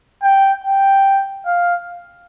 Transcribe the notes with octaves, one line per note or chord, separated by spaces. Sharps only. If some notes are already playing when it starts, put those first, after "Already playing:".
G5
G5
F5